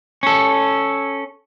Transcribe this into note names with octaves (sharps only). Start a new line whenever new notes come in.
C#4 A4